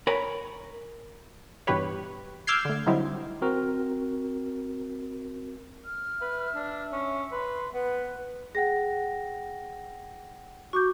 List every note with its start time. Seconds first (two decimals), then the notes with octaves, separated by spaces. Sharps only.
0.07 A#4 C#5 G#5 A#5 B5
1.67 G2 B2 E3 G4 B4 C#5
2.47 D6 E6 F6 G6 G#6 C7
2.65 D3 A3
2.86 D3 F#3 G3 C4 D#4 E4
3.42 C4 F#4 A#4
5.85 F6
6.21 B4 E5
6.55 D4
6.93 C#4
7.32 B4 C6
7.74 B3 B4
8.55 G#4 F#5 G5 A#6
10.73 F#4 C#6 D6 G6